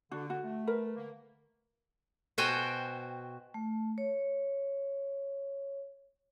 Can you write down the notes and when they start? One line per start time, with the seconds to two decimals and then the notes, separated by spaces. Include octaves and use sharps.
0.11 D3 D4 F#4
0.30 F#4
0.44 A3
0.67 A#4 B4
0.96 D3 A#3
2.38 B2 F#4 C5 G5 G#5
3.54 A3
3.98 C#5